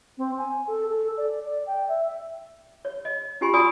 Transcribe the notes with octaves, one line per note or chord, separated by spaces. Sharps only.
C4
G#5
A4
A4
D5
D5
G5
E5
C#5
D#5
C#4 F4 G4 G#5 B5 C6
F#4 D5 G#5 B5 D#6 E6